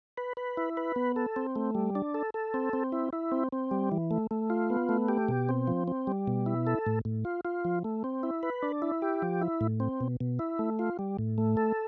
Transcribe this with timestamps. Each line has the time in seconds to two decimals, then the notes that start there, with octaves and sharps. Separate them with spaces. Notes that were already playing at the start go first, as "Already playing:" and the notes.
0.17 B4
0.37 B4
0.57 E4
0.77 B4
0.96 B3
1.16 A4
1.36 C4
1.56 A3
1.75 G3
1.95 D4
2.14 A4
2.34 A4
2.54 C4
2.73 C4
2.92 E4
3.13 E4
3.32 C4
3.52 C4
3.71 G3
3.92 E3
4.11 A3
4.31 A3
4.50 F4
4.70 B3
4.89 A3
5.08 G4
5.28 B2
5.49 C4
5.67 F3
5.88 C4
6.07 G3
6.27 B2
6.46 E4
6.67 A4
6.86 A2
7.05 A2
7.25 F4
7.45 F4
7.65 F3
7.84 A3
8.04 C4
8.23 E4
8.43 B4
8.63 D4
8.82 E4
9.02 G4
9.22 F3
9.41 E4
9.61 A2
9.80 C4
10.01 B2
10.20 B2
10.39 E4
10.59 A3
10.79 F4
10.99 G3
11.19 A2
11.38 A3
11.57 A4